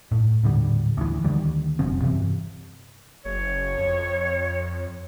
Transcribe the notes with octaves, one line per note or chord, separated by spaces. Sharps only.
A2
D#1 A2 D3 G3
D2 E3
D2 D#3 E3 G3
F1 C2 F#2 C4
G2 C3 E3
F#1 C#5
F2